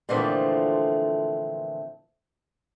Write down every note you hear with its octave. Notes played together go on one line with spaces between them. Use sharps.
A#2 D3 E3 F3 A3 C4